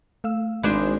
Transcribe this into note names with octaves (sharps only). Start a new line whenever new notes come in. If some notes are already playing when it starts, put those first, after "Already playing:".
A3 F5 E6
G#1 G#3 D4 C5 B5 C6 G6